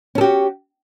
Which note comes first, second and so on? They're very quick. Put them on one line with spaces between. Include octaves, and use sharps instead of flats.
C#4 A4 G4 F#4